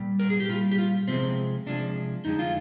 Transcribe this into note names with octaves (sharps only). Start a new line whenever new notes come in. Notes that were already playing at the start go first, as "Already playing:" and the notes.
Already playing: A#2 G3
A#4
G#4
G4
A#2 G3 F4
G4
F4
C3 F3 G#3 C4
C3 F3 G#3 D4
F2 D3 G#3 D#4
F4